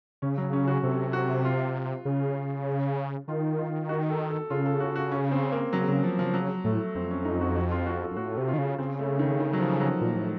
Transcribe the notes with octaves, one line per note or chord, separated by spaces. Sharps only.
C#3 C#4
F#3
C#4
F#4
C3 A4
F#4
F4
C#3
D#3 F4
F4
F#4
A4
A4
C#3 F4
A4
F#4
F#4
C#4
C4
A#3
C#3 F#3
C#3 F#3
F3
C#3 F3
C#3 F#3
A2 A3
F2 C4
C#4
D#4
F#4
F#4
F4
F#4
A4
F#2
A2 F#4
C3
F4
D#3
C#3
C#3 C4
A3
D#3
D#3
F#3
F3
F#3
A#2
A2